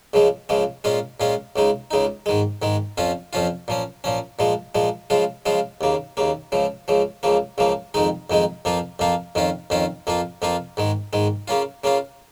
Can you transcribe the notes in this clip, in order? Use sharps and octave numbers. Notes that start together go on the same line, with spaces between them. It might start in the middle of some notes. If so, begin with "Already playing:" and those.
C#2 C#3 F3 G#3
C#2 C#3 F3 G#3
A#2 G#3 C#4 F4
A#2 G#3 C#4 F4
C#2 C#3 G#3 D#4
C#2 C#3 G#3 D#4
G#2 D#3 G#3
G#2 D#3 G#3
F2 F3 C#4 F4
F2 F3 C#4 F4
A#2 F3 C#4
A#2 F3 C#4
A#2 F3 G#3
A#2 F3 G#3
C#3 F3 G#3 F4
C#3 F3 G#3 F4
D#2 C#3 A#3
D#2 C#3 A#3
C#2 C#3 F3
C#2 C#3 F3
C#2 C#3 F3 A#3
C#2 C#3 F3 A#3
F2 D#3 G#3 D#4
F2 D#3 G#3 D#4
F2 F3 A#3 F4
F2 F3 A#3 F4
F2 D#3 C#4 F4
F2 D#3 C#4 F4
F2 F3 A#3 F4
F2 F3 A#3 F4
G#2 D#3 G#3
G#2 D#3 G#3
C#3 A#3 C#4 F4
C#3 A#3 C#4 F4